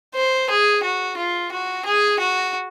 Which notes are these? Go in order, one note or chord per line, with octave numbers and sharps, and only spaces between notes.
C5
G#4
F#4
F4
F#4
G#4
F#4